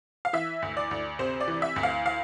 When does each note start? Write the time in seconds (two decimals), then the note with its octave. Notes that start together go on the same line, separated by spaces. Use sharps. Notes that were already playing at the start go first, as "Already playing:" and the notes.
0.25 F5
0.33 E3 E5
0.62 D2
0.77 D5
0.91 D2
1.19 C3 C5
1.41 D5
1.48 E3
1.62 E5
1.76 D2
1.83 F5
2.06 F5